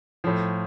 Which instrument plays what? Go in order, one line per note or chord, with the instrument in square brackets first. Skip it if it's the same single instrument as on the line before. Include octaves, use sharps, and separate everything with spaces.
[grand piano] A2 F3